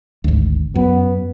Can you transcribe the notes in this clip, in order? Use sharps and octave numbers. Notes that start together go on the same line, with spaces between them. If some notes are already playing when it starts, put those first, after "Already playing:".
G#1 D2
F#2 B3